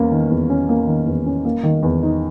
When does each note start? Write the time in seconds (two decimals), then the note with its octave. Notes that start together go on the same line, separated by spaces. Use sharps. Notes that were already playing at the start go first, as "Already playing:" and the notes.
Already playing: E2 A#3 C#4
0.11 D#3
0.30 E2
0.50 C#4
0.69 A#3
0.87 D#3
1.06 E2
1.26 C#4
1.45 A#3
1.63 D#3
1.83 E2
2.02 D#4